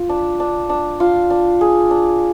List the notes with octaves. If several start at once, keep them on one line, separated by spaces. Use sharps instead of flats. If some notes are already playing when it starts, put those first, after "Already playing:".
Already playing: F4
D4
D4
D4
F4
D4
G#4
D4